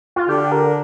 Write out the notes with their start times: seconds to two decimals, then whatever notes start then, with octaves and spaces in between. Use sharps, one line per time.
0.16 F4
0.28 D3 G4
0.52 A#4